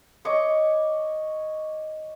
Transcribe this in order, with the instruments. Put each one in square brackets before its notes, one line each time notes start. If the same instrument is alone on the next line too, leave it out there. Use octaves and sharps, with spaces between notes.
[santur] C#5 D#5 C#6 D6